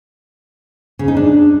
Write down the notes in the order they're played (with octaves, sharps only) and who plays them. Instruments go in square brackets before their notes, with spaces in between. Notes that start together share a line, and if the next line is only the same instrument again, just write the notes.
[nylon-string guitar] C#3
D#4
D4